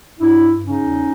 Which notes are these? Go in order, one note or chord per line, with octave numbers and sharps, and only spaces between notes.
G2 D4 E4
G2
G2
C#3 C#4 D#4
E2
C#3